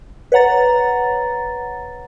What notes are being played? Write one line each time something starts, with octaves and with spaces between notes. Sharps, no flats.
B4 C#5 F#5 A#5 A6